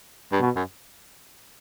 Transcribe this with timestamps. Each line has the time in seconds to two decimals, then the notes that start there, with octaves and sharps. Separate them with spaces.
0.32 G2
0.40 B2
0.56 F#2